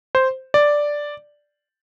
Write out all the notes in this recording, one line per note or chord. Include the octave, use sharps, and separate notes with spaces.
C5
D5